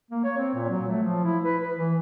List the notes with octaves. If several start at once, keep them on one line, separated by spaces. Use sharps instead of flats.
A#3
C#5
C4
A#2
F#3
A3
F3
E4
B4
B4
E3